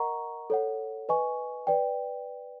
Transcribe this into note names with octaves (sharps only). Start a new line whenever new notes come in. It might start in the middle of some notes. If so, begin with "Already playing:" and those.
Already playing: A#4 D#5 F#5 A#5 C#6
A4 C#5 F#5
B4 D#5 G#5 C#6
B4 D5 G5